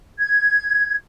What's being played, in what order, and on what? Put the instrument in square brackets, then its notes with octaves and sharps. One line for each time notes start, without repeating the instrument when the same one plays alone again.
[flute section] G#6